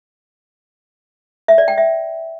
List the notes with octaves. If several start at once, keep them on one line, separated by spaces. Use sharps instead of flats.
E5
D5
G5
E5